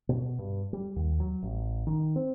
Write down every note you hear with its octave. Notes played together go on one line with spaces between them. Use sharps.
B2
G2
G3
D#2
F#3
A1
D#3
C4